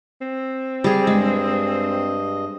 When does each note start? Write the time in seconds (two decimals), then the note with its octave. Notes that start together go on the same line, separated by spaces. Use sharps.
0.21 C4
0.84 G3 G#4
1.07 G2 G#3 D#5